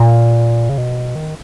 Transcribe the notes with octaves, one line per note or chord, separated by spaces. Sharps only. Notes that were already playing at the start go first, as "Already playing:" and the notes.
Already playing: A#2
C#3
B2
D#3